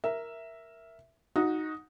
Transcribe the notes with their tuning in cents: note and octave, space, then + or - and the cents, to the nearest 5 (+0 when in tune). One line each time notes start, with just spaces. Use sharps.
A#4 +0 E5 +0
D#4 +5 F#4 -15